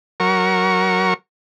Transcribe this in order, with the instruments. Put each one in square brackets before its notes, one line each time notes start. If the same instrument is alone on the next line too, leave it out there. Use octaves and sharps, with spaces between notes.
[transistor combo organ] F#3 A#4 C#6